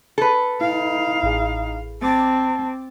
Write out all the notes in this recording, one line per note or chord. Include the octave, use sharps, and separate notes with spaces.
A4 B4
D#4 E4 F5
A1 G#4
C4 A5 D6 A6